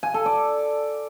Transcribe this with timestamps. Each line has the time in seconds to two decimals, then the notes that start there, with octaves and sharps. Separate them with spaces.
0.03 G#5
0.14 A4
0.26 D5